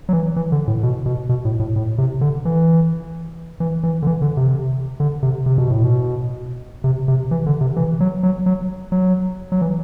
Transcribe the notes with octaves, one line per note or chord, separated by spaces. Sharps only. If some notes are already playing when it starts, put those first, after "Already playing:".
F#3
E3
E3
D3
A2
B2
B2
B2
A2
A2
A2
C3
D3
E3
E3
E3
D3
E3
D3
C3
D3
C3
C3
B2
A2
B2
C3
C3
E3
D3
C3
E3
F#3
F#3
F#3
F#3
F#3
E3